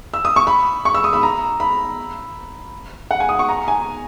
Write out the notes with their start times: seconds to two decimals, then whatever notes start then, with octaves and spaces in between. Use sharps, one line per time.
0.14 E6
0.25 D#6
0.36 C#6
0.47 B5
0.85 C#6
0.94 E6
1.04 D#6
1.13 B5
1.23 A#5
1.60 B5
3.11 F#5
3.20 G#5
3.29 D#6
3.39 C#6
3.49 A#5
3.68 G#5